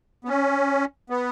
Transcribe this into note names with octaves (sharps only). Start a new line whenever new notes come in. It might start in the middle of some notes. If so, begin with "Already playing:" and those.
B3
C#4
B3